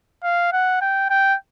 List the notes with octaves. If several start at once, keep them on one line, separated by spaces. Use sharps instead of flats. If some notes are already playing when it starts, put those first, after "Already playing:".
F5
F#5
G5
G5